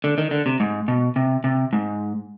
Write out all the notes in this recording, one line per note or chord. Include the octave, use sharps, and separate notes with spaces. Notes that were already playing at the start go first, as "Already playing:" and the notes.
D3
D#3
D3
C3
G#2
B2
C3
C3
G#2